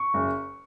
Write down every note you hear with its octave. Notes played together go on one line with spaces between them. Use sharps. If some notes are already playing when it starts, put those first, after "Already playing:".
Already playing: C#6
F#1